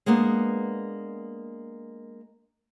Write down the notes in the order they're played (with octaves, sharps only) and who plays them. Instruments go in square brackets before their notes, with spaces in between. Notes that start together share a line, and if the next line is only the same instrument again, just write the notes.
[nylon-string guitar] G#3 A#3 B3 D4